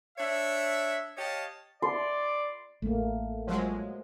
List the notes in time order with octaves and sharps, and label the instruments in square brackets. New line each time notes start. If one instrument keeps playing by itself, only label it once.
[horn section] D4 C#5 E5
G4 C#5 D#5 F5 A5
[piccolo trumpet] D5 [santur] C6
[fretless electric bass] A1 [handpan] A3 A#3
[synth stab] F3 F#3 G#3